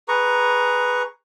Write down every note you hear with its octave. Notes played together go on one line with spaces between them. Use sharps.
G#4 B4 A#5 C#6